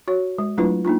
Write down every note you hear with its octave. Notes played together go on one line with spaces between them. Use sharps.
F#4 C#5
G#3
F#3 A3 D4 E4 F4 B4
A#3 D4 D#4 F4